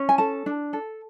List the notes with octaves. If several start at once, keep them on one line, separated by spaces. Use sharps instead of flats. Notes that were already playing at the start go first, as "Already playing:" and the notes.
Already playing: C#4
G#5
A4 A5
D4
A4